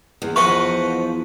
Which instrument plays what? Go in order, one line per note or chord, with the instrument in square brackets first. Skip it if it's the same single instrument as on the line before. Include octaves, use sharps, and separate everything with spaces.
[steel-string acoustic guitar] E2
[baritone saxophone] F3 [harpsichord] B4 D#5 F#5 [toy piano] C#6